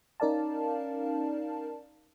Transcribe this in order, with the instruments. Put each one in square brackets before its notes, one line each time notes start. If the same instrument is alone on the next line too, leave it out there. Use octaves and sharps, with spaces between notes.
[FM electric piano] C#4 D#4 A#4 D5 F5 A5